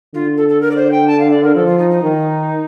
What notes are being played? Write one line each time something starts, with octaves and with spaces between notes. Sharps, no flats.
D3 F4
A4
A4
A#4
D5
C5
G5
A5
F5
D5
A#4
F3 A4
F4
D#4
D#4
D#3